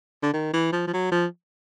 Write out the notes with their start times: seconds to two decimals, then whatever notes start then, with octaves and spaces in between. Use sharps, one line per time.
0.22 D3
0.33 D#3
0.53 E3
0.72 F3
0.87 F3
0.93 F#3
1.12 F3